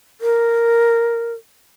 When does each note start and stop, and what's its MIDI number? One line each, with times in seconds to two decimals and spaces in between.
0.21 1.33 70